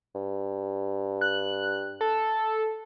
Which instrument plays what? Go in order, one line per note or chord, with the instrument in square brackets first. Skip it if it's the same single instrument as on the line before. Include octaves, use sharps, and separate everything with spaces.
[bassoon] G2
[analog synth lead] F#6
A4